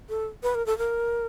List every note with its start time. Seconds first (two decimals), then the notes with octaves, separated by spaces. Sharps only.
0.09 A4
0.43 B4
0.55 A#4
0.66 A4
0.78 A#4